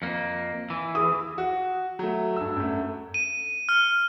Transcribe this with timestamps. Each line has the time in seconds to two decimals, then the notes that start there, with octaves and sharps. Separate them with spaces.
0.02 F2 A#3
0.70 E3
0.95 G#4 D#6
1.38 F#4
1.99 F#3 A3
2.36 G2 E6
2.56 F#2 A3
3.14 D#7
3.69 F6